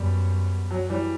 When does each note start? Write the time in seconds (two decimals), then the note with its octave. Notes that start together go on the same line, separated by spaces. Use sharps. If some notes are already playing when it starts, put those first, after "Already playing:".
Already playing: F#2 G3 B3
0.71 F#3
0.89 E3 G3